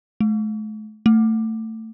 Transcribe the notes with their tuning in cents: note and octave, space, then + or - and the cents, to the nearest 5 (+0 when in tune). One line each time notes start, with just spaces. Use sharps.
A3 -40
A3 +20